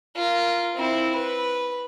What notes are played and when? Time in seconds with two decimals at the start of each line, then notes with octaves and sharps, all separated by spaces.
0.16 F4 A#4
0.75 C4 E4
1.15 B4